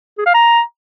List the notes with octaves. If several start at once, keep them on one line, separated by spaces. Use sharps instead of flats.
G#4
F5
A#5